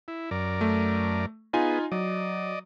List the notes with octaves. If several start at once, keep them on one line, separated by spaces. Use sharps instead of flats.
E4
F#2 A#4 D5
A3
B3 D#4 F4 G#4 G#5
F#3 D5 D#5